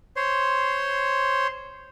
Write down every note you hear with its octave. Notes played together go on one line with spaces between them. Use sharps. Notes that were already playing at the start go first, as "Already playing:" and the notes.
C5 C#5 C6